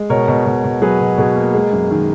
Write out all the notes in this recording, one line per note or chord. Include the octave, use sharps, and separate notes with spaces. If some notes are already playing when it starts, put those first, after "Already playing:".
Already playing: G#3
B2 A#4 C#5
B2
B2
B2
F#3 G#4 B4
B2
B2 G#4 B4
A#3
G#3
F#2
D#3